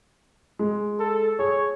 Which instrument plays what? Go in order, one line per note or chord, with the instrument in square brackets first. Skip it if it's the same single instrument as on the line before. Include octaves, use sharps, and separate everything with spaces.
[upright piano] G#3
[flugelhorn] A4
[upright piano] G#4 [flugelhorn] C#5